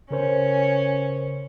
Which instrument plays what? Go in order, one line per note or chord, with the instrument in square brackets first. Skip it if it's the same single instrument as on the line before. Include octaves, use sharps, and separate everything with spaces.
[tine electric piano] C#3 A#4 C5 [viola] C#4